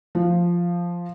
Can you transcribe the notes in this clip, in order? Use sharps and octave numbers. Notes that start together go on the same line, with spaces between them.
F3